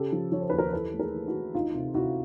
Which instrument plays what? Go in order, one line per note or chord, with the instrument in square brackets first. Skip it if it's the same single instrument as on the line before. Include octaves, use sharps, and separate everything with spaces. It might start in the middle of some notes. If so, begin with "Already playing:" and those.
Already playing: [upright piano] C#3 G4 A4
F3
F3 C#5
C5
D#2 B4
A#4 C5
C5
E3 A4 B4
A3
G#4 A#4
E3
E4 F#4
E3
D2 D#4 F4
C3
C3 E4 F#4